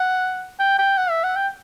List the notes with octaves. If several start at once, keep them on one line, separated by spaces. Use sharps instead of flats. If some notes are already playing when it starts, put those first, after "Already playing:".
Already playing: F#5
G5
G5
F#5
E5
F#5
G5